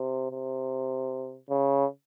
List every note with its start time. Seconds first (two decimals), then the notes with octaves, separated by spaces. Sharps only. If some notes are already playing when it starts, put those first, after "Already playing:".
Already playing: C3
0.31 C3
1.50 C#3